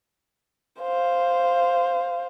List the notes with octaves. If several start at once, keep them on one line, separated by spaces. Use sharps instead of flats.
C5 F5